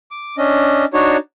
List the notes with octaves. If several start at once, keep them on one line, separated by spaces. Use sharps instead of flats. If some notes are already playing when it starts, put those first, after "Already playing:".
D6
C#4 D4 D#5
D4 D#4 F#4 C#5